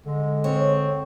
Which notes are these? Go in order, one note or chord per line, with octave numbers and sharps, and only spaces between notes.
D3 G#3
C4 C#5